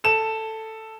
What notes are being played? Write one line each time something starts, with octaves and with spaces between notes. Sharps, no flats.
A4 E7